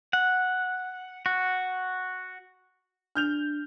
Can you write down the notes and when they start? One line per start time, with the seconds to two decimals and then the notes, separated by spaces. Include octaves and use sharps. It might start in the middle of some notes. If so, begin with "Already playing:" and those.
0.13 F#5
1.26 F#4
3.15 D4 F6 G6 F7